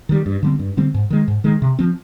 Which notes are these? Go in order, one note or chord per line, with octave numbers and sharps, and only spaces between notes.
D#3 G3
G2
D3 G3 C4
G2
D3 G3 C4
G#2
D#3 G#3
G#2
D#3 G#3
C3
F3 C4